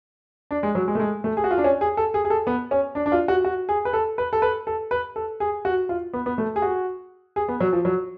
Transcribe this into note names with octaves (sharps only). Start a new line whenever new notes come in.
D4
G#3
F#3
G#3
A3
G#3
A3
G#4
F#4
F4
D4
C#4
G#4
A4
G#4
G#4
A4
B3
C#4
D4
D4
F4
F#4
F#4
G#4
B4
A4
B4
A4
B4
A4
B4
A4
G#4
F#4
F4
B3
B3
A3
G#4
F#4
G#4
B3
F#3
F3
F#3